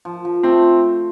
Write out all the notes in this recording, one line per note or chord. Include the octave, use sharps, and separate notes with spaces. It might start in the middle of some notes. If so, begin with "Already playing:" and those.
F3
F3
A3 C4